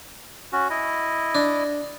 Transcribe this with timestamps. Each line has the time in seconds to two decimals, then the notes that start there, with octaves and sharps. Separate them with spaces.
0.53 C#4 F#4
0.70 E4 D#5
1.35 D4